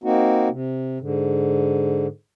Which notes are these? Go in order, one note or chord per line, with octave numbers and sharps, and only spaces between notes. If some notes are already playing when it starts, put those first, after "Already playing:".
A#3 C4 D#4 F#4
C3
G#2 D3